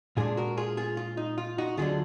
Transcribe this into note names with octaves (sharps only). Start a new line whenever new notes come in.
A#2 G#3 D4 F4 G#4
F#4 A#4
F4 G#4
F4 G#4
F4
D#4
F4
D#4 F#4
D2 D3 F#3 D4 F4 G#4